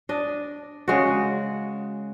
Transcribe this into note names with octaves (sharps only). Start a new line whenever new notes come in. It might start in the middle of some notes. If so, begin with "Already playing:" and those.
D4 D#5
C#3 G#3 F#4